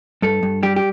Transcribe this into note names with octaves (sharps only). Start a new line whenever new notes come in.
G2 A4
G2
G3 G4
G4